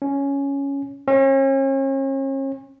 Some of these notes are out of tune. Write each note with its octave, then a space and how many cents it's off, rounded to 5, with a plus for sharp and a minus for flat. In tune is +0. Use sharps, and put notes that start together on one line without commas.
C#4 +5
C#4 -40